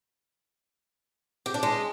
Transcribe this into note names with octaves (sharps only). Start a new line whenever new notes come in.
G4
D4
G#3